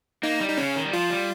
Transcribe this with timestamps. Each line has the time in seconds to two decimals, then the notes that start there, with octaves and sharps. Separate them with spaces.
0.23 A#3 D#4
0.41 G3
0.49 D#4
0.57 C#3 C#4
0.76 D#3
0.85 G3
0.93 F3 F4
1.10 G3